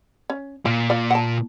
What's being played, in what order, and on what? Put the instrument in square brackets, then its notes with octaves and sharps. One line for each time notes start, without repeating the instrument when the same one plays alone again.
[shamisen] C#4
[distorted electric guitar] A#2 [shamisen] F4
[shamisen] F4 D5
F#5 A5